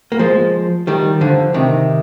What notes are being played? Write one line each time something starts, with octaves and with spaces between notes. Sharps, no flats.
A#3
F3 G#3
D#3 G3
D3 F3
C3 D#3